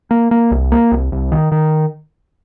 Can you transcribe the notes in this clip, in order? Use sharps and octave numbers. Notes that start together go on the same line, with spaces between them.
A#3
A#3
C2
A#3
C2
C2
D#3
D#3